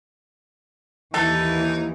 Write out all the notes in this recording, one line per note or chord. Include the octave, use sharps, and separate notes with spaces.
D#2 E3 D#4 A4